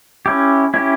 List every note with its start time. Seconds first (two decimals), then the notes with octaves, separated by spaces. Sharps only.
0.26 C#4 E4 G4
0.74 C#4 E4 G4